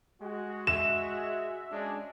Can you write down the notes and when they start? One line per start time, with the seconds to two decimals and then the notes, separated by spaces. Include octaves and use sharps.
0.21 G#3 F#4
0.67 E5 E7
1.71 G#3 C#4 D4